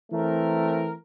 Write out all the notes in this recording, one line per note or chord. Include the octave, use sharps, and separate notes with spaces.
E3 A3 C4 A#4